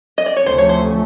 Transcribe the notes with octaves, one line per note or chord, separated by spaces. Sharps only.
D#5
D5
C#5
D2 C3 F3 A3 C#4 C5
C#5
C5